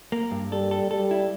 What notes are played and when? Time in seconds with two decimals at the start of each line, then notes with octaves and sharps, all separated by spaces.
0.12 A#3
0.31 G2
0.51 G3 A4
0.71 A4
0.91 G3 A4
1.11 E4